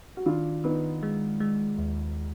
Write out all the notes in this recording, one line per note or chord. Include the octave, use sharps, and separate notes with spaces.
F#4
D#3 D4 F4
D#3 B3 D#4
G#3
G#3
D#2